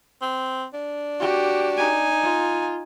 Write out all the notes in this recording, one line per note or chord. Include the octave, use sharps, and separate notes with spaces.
C4
D4
F#4 G4
D#4 G#5
F4